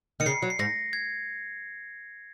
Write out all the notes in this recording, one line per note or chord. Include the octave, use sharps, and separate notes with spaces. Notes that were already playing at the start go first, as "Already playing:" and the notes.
D#3 C#7
C#3 C7
F#3
C7
G#2 A#6
G#6